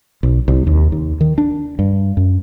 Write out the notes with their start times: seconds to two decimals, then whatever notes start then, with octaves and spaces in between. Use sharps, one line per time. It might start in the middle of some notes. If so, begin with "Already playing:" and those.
0.23 B1
0.48 C2
0.67 D#2
0.92 D#2
1.21 D#3
1.38 D4
1.79 G2
2.17 F#2